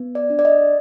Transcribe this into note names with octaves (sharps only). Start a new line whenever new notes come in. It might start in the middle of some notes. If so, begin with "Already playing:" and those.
Already playing: B3
D5
D4
D5
D#5